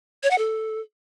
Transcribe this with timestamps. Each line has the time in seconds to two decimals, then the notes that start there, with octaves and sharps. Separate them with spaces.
0.23 C#5
0.31 F#5
0.38 A4